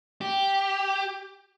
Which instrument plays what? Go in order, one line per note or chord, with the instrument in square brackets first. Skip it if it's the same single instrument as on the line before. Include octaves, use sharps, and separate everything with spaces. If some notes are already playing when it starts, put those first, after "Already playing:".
[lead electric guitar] G4